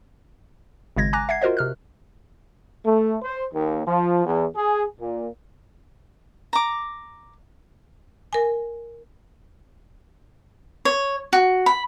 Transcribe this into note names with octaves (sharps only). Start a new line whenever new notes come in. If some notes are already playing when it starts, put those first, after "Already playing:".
G#1 C#3 G#3 G#6 A#6
G#5 A#5 D6 F#6 A#6
E5 F#5 G#6 C7
F4 F#4 A#4 C5 D#5
C3 F6 F#6
A3
C5
D#2
F3
E2
G#4
A#2
A#5 D6
A#4 G#5
C#5
F#4
B5